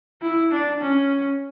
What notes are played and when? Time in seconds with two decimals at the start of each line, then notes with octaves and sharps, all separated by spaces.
0.22 E4
0.52 D4
0.82 C#4